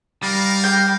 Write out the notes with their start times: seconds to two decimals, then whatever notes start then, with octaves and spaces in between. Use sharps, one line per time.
0.23 G3 D#4 A#4 F5
0.64 G5 D6